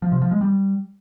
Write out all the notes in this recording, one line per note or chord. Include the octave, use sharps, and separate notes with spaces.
F3
C3
F3
G#3
G3